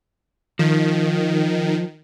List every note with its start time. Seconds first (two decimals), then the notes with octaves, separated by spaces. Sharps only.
0.59 D#3 F3